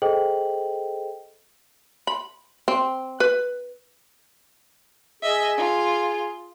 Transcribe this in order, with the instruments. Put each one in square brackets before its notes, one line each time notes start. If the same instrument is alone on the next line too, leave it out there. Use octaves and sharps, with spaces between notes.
[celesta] G#4 A4 C5 D#5 G5 F#7
[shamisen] B5
C4
B4
[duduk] G#4 [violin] D#5 E5
[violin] F4